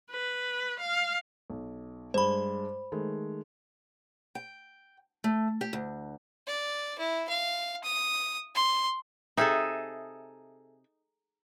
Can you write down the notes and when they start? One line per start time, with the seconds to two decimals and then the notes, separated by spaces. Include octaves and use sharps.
0.11 B4
0.80 F5
1.50 B1
2.14 G2 G#3 C5 B5
2.92 D#3 G#3 A3
4.35 G5
5.24 A3
5.61 G4
5.73 D2
6.47 D5
6.99 E4
7.29 F5
7.84 D#6
8.55 C6
9.37 C3 D#4 G#4 A4 E5